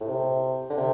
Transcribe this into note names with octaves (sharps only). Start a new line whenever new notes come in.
A2
C3
D3
C3